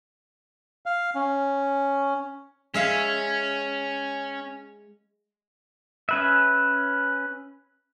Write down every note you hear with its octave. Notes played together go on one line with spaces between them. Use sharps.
F5
C#4
G#3 C#4 E5 F5
C#4 B4 E5